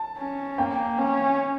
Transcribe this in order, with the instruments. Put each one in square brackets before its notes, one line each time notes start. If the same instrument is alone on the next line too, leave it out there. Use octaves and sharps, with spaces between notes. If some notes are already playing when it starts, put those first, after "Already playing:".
Already playing: [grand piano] A5
[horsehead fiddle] C#4
[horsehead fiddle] A#3 [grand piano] G5
[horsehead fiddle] C#4